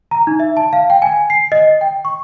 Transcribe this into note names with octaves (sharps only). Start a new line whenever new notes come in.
A#5
D#4
E5
A5
F5
G5
G#5
C7
D#5
G5
C#6